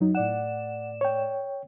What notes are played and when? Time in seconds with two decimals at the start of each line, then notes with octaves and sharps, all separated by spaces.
0.01 F#2 F#3 D#4
0.15 A2 D5 F#5 E7
1.01 C#5 G5